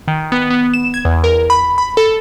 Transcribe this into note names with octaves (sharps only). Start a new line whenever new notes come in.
D#3
B3
B3
E7
G#6
E2
A#4
B5
B5
A4